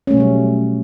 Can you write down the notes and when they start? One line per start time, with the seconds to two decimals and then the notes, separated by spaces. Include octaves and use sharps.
0.07 C#4
0.11 A3
0.14 B2
0.17 F#3
0.20 G3